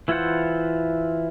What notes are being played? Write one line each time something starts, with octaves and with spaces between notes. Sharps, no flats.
E3 E4 F4 C5 F#5